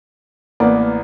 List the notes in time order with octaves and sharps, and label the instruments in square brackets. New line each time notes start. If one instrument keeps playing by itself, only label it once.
[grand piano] A1 B3 D5 [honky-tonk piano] A#3